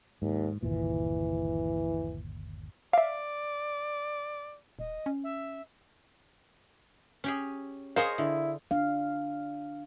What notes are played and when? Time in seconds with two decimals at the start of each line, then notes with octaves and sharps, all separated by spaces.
0.22 D#2 G#2
0.63 G1 D#2 A#2 E3
2.93 D5 E5 F5
4.79 D#1 D#5
5.06 C#4
5.23 E5
7.24 C#4 G4 G#4
7.96 G#4 A#4 C5 C#5 D#5 F5
8.18 D3 E4
8.71 D4 F5